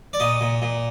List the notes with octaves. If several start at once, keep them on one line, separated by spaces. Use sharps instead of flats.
D5
A#2 D#5
A#2
A#2